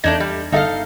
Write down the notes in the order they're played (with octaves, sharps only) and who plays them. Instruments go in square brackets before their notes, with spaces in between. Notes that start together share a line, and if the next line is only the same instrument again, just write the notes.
[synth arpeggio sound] E2 G#6 [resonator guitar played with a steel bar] A3 D4 D#4
[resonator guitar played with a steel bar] G3
[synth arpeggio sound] G1 E5 [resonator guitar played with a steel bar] D#4 A4 F5